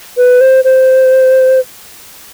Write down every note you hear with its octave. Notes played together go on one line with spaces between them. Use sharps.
B4
C5
C5